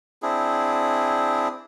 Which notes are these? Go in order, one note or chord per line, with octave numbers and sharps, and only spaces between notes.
C4 D4 E4 G#4